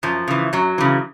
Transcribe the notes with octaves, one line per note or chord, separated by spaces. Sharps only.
F#2 F3
C#3 E3
F#2 F#3
C#3 E3